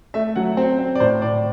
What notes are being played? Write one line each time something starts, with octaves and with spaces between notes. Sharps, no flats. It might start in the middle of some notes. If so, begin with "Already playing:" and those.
A3 E5
F#3 F#5
C4 C5
C4
D5
A2 C5
A2 D5